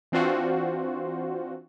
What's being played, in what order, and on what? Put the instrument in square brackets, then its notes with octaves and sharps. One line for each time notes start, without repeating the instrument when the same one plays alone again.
[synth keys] E3 C4 D4 F4 F#4 C5